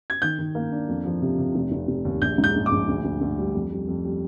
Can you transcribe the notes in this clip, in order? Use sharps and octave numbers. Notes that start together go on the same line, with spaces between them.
G#6
D#3 G6
D#3
A#3
D4
F2
F3
C3
C3
F1
F1
F1
D#2
A#1 G6
G#2
G6
A#1
D6
A#1
D2
D2
D2
G3
F2
G3
F2
G3